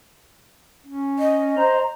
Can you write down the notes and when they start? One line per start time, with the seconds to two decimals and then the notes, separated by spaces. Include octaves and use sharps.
0.87 C#4
1.19 D#5
1.57 C5 A#5